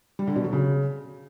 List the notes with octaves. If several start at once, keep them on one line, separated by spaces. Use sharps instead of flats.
G3
D3
B2
F#3
C#3